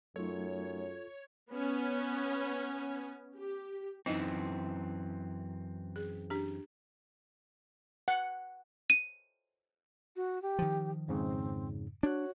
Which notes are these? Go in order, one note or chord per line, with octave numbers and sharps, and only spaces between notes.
F#2 F#3 A3 D#4 F4 A4 C#5
B3 C#4
G4
F#2 E3 C4 D#4 D#5
G#4
D4 G4
F#5
D#7
F#4
G4
D#3 F3
F2 G#2 C#3 C4
D4 F#4 C#5 F#6